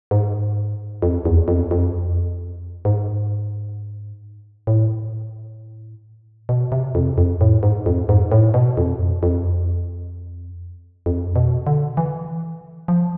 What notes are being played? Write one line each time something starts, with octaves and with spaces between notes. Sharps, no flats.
G#2
F2
E2
F2
F2
G#2
A2
B2
C3
F2
F2
A2
G#2
F2
G#2
A2
B2
F2
F2
F2
B2
D3
E3
F3